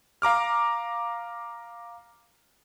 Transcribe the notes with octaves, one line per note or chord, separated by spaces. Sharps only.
F5 A#5 D6 F6